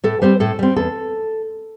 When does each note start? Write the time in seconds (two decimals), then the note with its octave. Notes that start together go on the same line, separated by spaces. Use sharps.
0.04 A2 A4
0.22 G3 C4 C5
0.40 A2 A4
0.59 G3 C4
0.76 E2 A4